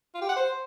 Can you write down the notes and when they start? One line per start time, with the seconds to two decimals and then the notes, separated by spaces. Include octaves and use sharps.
0.15 F4
0.22 G4
0.29 F#5
0.36 C5